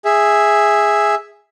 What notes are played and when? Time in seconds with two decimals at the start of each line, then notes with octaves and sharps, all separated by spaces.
0.05 G#4 E5